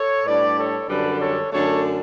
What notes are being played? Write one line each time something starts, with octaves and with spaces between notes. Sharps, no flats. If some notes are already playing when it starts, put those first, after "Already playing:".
Already playing: A4 C#5
A2 G3 D4 B4 D5
A4 C#5
F#2 D3 G3 D4 B4 D5
A4 C#5
F#2 D3 A3 D4 A4 C#5